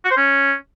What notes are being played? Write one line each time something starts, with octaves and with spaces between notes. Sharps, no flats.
F#4
C5
C#4